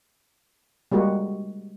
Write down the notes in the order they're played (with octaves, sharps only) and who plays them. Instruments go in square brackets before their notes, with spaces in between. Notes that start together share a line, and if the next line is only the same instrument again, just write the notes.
[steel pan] G3 G#3 A#3 F#4